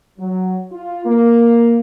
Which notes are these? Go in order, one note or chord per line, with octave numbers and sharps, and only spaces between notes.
F#3
F4
A#3